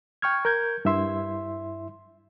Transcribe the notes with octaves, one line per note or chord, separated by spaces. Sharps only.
G5 C#6 F6 G#6
A#4 G6 G#6
G2 E4 E5 C6